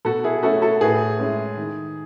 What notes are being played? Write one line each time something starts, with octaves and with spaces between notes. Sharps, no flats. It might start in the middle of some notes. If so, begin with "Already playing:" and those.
B2 F#4 A4
E4 G#4
A3 C#4 E4 F#4 A4
F#4 A4
A2 G#4 B4
G#3 C#4 E4
D#3